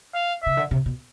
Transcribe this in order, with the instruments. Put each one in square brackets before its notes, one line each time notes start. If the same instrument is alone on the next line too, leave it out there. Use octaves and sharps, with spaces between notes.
[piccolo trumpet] F5
[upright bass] C#3 [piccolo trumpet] E5
[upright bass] D3
C3
B2